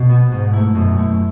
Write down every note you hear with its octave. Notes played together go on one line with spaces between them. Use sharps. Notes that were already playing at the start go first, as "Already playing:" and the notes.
Already playing: B2
B3 F#4
G#2 B2
A3 E4
F#2 B2
A3 E4